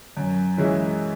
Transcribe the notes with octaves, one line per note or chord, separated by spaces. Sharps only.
F#2
E3 G#3 C#4 E4